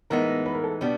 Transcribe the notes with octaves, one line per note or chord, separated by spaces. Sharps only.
A2 E3 G#3 B3 D#4 A#4
B4
A#4
A4
B2 G3 B3 D4